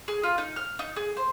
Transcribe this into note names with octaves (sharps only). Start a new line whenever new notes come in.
G#4
F4
D#4
F6
D#4
G#4
C5